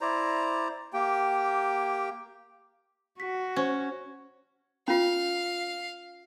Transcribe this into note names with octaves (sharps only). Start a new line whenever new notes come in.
E4 C5 D5 A#5
A#3 G4 G5
F#4 B6
C#4 C5
C#4 F4 F5